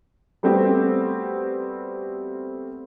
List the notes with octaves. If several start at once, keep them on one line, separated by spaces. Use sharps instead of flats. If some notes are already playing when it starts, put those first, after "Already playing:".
G3 A3 B3 C4 F#4 G4